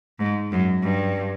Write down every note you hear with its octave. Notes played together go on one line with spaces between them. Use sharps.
G#2
F#2
G2